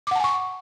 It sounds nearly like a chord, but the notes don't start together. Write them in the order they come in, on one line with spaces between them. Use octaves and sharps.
D6 F#5 A5 G#5 C#6